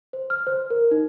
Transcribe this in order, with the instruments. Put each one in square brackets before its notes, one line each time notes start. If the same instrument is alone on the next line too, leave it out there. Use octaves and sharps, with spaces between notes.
[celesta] C5
F6
C5
A#4
D#4